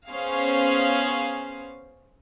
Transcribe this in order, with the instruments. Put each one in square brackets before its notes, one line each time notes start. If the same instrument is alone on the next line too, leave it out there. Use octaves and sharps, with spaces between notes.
[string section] B3 C#4 G#4 C5 F5